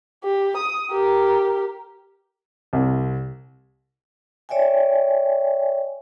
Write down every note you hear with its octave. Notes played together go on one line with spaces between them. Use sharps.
G4
D#6
G4 A#4
C2
C#5 D5 E5 G5 G#5